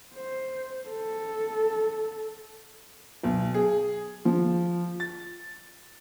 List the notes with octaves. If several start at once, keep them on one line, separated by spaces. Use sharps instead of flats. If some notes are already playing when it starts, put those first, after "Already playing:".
C5
A4
B1
G#4
F3
A6